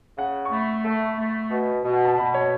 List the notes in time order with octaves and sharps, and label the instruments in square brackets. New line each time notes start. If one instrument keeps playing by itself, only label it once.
[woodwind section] C#3 [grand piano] F#5
[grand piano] C#6
[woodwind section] A3 [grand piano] B5
[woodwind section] A3
A3
B2
B2
[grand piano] F#5
A5
[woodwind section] B2 [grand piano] B5
[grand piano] C#5